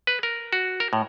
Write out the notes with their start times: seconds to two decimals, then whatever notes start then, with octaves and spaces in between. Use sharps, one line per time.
0.07 B4
0.23 A#4
0.53 F#4
0.80 A#4
0.93 A2